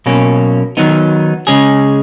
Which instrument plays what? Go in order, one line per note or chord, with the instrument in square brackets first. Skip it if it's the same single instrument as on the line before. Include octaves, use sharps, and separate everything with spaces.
[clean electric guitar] B1 B2 A#3 C#4
D#3 F#3 B3 D#4
C#3 G#3 C#4 G#4